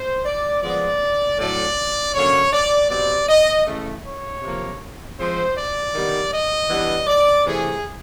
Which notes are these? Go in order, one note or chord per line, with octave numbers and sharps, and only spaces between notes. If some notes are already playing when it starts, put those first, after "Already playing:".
Already playing: C5
D5
F3 G#3 B3 D5
A2 F#3 A3 D4 D5
D3 F#3 A#3 C#4 C#5
D5
B2 G3 C4 D5
D#5
C#3 E3 A3
C#5
C3 F3 A#3
F3 G#3 C4 C5
D5
D#3 G3 B3
D#5
E3 G3 B3 D4
D5
C3 E3 A3 G#4